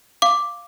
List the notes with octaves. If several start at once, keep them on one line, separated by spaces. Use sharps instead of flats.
F5 D6